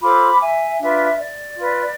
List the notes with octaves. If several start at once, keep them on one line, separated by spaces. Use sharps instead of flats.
F4 A4 C5 B5 D6
E5 G#5
D4 F4 B4 E5
D5
F4 B4